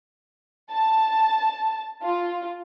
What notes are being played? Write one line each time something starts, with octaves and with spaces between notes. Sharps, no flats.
A5
F4